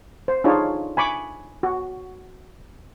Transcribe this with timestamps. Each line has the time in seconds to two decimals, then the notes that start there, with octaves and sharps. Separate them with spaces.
0.28 C5
0.44 D4 D#4 F4 G#4 C#5
0.97 G#5 B5 C#6 D6
1.63 F#4